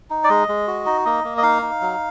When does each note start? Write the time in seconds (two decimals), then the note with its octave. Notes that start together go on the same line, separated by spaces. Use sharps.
0.10 D#4
0.24 D5
0.29 G#3 D#5
0.48 G#3
0.67 F#4
0.86 D#4
1.05 A#3 D#5
1.24 A#3
1.38 D#5
1.43 D#4 F5
1.62 D#4
1.81 F#3